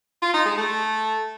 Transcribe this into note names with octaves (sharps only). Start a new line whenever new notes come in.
F4
D#4
G#3
A3